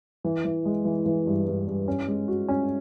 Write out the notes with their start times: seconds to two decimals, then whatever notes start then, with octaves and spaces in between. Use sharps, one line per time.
0.24 E3
0.45 E3
0.65 G#3
0.85 E3
1.06 E3
1.26 G2
1.47 G2
1.67 G2
1.88 C#4
2.08 G#3
2.28 F#4
2.48 C#4